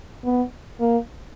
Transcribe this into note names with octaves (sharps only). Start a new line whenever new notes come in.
B3
A#3